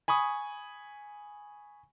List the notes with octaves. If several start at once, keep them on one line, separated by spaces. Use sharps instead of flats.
G#5 B5 C#6 D#6